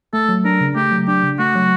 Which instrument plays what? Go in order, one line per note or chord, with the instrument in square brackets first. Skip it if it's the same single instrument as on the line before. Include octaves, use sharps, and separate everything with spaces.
[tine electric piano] A3 [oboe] A4
[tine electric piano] F#3
[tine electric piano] D4 [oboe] A#4
[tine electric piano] C#3
[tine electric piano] A3 [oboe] G4
[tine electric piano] F#3
[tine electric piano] D4 [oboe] G4
[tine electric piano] C#3
[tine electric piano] A3 [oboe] F#4
[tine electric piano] F#3